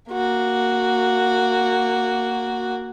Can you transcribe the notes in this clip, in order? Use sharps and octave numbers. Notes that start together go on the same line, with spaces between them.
A#3 F#4